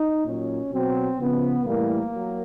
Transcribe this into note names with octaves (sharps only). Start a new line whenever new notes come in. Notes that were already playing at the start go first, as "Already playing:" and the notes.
Already playing: D#4
A#2 F#3 C#4
B2 F#3 C4
C#3 F3 B3
A2 E3 G3 A#3
F#3